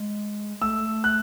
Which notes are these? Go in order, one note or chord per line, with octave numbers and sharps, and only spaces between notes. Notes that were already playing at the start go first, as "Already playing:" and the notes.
Already playing: G#3
A3 E6
F#6